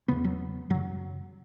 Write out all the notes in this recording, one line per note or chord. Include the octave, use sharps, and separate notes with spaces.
E2 C#3 B3
F#3
F#2 C#3 F#3